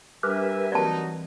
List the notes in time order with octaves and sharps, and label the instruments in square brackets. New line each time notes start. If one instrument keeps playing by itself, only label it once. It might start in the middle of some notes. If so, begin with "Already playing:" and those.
[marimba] G3 D4 [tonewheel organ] G4 A#4 B4 [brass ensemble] E5 G#5
[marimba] E3 A#3 C4 [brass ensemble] F#3 D#4 F#4 [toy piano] D5 A5